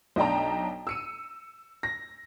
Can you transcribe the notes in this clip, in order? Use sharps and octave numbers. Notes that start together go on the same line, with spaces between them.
B1 D4 D#5 G5 A5 A#5
E6 C#7 D#7
A#6